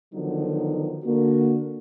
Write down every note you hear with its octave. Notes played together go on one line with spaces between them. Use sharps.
D3 D#3 F3 F#3 B3 D#4
D3 A#3 F#4